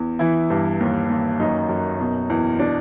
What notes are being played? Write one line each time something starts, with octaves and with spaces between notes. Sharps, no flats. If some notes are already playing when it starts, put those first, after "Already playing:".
Already playing: E2
E3 E4
G2
D#2
D#2
F#2 D#4
F#2
B2
E2
B2 D4